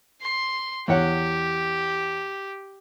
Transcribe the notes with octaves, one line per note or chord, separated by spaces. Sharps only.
C6
E2 G4 C#5 F#5